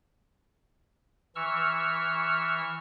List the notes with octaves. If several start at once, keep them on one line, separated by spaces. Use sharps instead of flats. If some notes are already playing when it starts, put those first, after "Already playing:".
E3 C#6 E6 F6